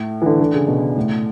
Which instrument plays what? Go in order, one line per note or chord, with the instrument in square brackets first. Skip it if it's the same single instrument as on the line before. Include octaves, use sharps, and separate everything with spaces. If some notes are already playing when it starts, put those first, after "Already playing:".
Already playing: [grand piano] A2
E3
D3
D3
C#3
B2
A2